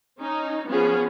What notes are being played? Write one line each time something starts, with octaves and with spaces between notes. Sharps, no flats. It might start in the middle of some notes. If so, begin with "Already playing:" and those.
C#4 D#4
F3 B3 C#4 G#4